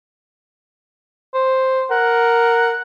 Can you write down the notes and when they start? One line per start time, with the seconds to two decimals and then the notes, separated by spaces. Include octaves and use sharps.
1.34 C5
1.91 A#4 F#5